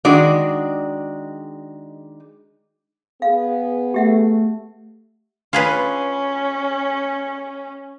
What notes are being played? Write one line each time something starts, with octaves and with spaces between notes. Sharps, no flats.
D#3 G#3 D4 F#4 D5
B3 G#4 F5
A3 G4 E5 F#5
C#4 F4 G#4 B4